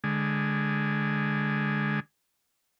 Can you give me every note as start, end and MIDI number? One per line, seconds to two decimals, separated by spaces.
0.04 2.00 50
0.04 2.00 56